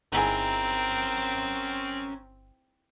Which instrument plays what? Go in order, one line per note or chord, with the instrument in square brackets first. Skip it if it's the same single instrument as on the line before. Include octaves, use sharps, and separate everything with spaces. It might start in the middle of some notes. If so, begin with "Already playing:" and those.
[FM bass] G1 [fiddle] C4 [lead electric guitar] C#4 A#4 [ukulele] D#4 E4 G#4